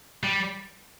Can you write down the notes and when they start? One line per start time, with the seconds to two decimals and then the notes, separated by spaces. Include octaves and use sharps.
0.23 G3